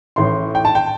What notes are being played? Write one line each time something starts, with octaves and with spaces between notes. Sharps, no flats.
A1 A2 E3 C6
G5
A5
G5